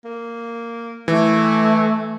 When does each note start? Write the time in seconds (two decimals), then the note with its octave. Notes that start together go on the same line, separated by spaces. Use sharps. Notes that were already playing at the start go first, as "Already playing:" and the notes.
0.04 A#3
1.08 E3 A3 E4